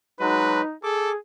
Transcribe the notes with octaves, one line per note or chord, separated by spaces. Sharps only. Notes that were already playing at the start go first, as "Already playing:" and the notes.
F#3 G#3 D#4 F#4 B4
G#4 A4 D6